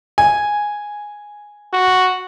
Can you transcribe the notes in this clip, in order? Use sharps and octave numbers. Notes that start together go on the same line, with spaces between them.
G#5
F#4